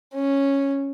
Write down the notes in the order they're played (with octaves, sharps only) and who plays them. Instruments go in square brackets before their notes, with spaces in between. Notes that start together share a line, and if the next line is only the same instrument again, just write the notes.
[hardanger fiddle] C#4